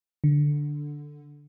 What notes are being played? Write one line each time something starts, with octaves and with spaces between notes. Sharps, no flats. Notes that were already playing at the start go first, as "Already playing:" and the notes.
D3